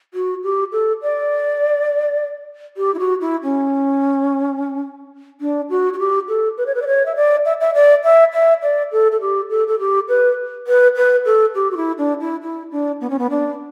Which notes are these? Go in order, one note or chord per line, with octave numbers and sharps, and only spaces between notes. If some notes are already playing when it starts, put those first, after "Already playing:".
F#4
G4
A4
D5
G4
E4
F#4
E4
C#4
D4
F#4
F#4
G4
A4
B4
C#5
B4
D5
C#5
E5
D5
E5
E5
D5
E5
E5
D5
A4
A4
G4
A4
A4
G4
B4
B4
B4
A4
G4
F#4
E4
D4
E4
E4
D4
B3
C#4
B3
D4